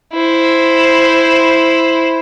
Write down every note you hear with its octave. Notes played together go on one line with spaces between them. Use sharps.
E4 C5